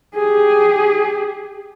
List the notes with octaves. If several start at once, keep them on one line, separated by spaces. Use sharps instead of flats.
G4 G#4